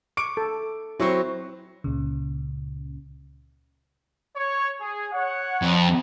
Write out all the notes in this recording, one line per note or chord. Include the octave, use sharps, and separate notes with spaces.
C#6 D6 D7
A4
F#3 C4 E4 C#5 C#6
C#2 A#2 C#3
C#5
G#4
C#5 F#5
F2